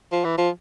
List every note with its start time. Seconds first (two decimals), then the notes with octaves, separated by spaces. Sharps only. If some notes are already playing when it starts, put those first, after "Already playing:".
0.12 F3
0.25 E3
0.38 F3